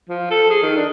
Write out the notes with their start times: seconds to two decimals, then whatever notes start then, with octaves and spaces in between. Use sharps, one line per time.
0.09 F3
0.31 A4
0.50 G#4
0.63 D#3
0.76 D4